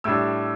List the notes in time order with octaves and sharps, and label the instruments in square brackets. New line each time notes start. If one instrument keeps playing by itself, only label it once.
[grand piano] A2 G3 D4 E6